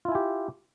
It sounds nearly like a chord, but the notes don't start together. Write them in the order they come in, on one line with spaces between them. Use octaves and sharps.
F4 E4 G#5 G4